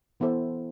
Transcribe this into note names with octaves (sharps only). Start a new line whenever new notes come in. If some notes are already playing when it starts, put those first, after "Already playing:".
E3 B3 E4 A4 C5